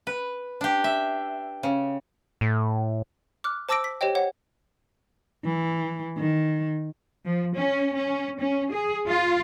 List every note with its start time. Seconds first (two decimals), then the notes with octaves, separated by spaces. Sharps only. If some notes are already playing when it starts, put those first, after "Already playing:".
0.07 B4
0.61 D4 G4
0.84 E5
1.63 C#3
2.41 A2
3.44 D6 F6 F#6
3.69 C5 A5 D6 E6 A#6 D7
3.84 B6
4.01 G4 C5 C#5 D#5 G5
4.15 C#5 F#5
5.45 E3
6.17 D#3
7.25 F3
7.56 C#4
7.94 C#4
8.40 C#4
8.70 G#4
9.07 F4